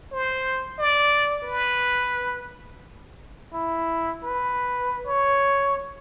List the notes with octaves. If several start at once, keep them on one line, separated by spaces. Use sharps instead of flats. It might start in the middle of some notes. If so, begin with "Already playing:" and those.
C5
D5
B4
E4
B4
C#5